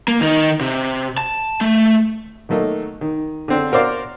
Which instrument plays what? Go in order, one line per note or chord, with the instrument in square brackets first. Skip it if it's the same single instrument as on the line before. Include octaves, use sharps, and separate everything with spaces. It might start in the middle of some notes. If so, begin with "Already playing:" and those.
[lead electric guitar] A#3
D#3 D#4
C3
A5
A3
[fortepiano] D#3 F#3 A3 A#3 D#4
D#3
D3 C4 D4
F#4 A#4 C5 D5 F5